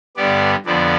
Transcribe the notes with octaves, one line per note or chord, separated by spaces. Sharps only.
G2 D3 G3 B3 D5
F2 D3 F3 B3 D5